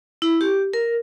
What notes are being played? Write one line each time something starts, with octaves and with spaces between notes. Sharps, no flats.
E4
G4
A#4